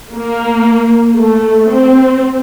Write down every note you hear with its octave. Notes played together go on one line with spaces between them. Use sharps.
A#3
A3
C4